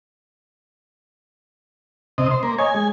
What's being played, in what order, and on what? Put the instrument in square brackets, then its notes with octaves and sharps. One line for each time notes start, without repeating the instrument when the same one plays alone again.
[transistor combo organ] C3 D#5
C5
A#3
[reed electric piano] C#5 D#5 [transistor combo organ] G#5
[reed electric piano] G#3